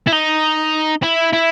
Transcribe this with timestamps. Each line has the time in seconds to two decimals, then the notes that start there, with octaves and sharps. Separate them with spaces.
0.07 E4
0.12 D#4
1.03 E4
1.33 E4